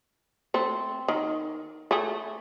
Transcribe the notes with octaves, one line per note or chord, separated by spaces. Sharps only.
A3 C4
D#3
A3 G#4